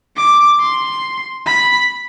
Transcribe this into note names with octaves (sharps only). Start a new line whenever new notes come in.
D6
C6
B5